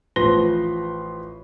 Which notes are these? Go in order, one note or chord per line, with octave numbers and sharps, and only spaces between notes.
A1 F3 B4 C6 A#6 G7